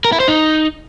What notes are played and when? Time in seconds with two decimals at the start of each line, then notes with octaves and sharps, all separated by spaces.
0.05 A#4
0.12 E4
0.20 C5
0.28 D#4